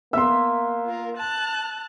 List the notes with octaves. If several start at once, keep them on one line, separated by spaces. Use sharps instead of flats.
A#3 B3 E5 C6 E6
F4 A#4
A5 F#6